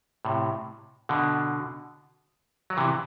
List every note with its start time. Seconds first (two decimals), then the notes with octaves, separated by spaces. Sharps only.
0.25 A2 C3
1.09 B2 D3
2.70 F#3
2.77 C3 E3